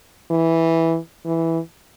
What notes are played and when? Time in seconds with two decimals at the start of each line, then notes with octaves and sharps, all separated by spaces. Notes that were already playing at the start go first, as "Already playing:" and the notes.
0.31 E3
1.26 E3